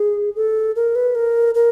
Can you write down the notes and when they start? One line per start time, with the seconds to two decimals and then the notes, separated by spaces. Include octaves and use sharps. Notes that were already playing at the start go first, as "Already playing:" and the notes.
Already playing: G#4
0.36 A4
0.76 A#4
0.95 B4
1.15 A#4
1.55 A#4